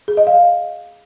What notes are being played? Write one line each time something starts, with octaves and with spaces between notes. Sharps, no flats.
G#4
D#5
F5